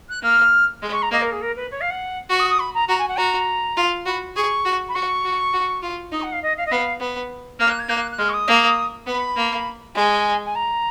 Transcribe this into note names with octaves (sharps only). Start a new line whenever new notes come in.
F#6
A#3 F6
G#3
C#6
A#5
A#3 D#5
A#4
G#4
A#4
B4
C#5
F5
F#5
F#4 C#6
D#6
D#6
B5
A#5
F#4 A#5
G#5
F#5
F#4 A#5
F4
F#4 B5
G#4 C#6
F#4
B5
F#4 C#6
F#4
F#4
F4
D#4 D#6
F#5
F5
D#5
F5
D#5
B3 F5
B3
A#3 F6
F#6
G#6
A#3 F#6
F#6
G#3 F6
C#6
D#6
A#3
B3 B5
A#3
G#3 G#5
G#5
A#5